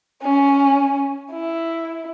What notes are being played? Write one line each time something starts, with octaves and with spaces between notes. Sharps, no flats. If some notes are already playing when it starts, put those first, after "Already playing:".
C#4
E4